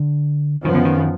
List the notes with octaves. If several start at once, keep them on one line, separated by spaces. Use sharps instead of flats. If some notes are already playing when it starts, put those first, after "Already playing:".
Already playing: D3
F#2 D#3 F3 B3
D3
D#3